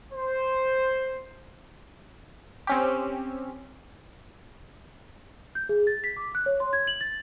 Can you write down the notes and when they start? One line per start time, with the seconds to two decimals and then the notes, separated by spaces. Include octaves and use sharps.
0.12 C5
2.67 C4 C#4 G4
5.55 G6
5.69 G#4
5.87 A6
6.04 B6
6.17 D6
6.35 F#6
6.46 C#5
6.60 C6
6.73 G#6
6.87 F#7
7.01 A6